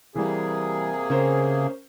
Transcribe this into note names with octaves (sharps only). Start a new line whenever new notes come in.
C3 E3 G3 A#3 G#4
C#3 C#4 A#4 C5